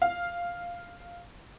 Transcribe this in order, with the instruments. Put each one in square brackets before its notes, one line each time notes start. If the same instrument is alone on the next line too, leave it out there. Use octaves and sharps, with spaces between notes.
[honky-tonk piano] F5